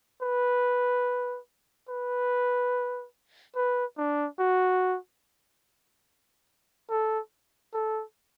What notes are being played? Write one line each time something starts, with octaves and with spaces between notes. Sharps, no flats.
B4
B4
B4
D4
F#4
A4
A4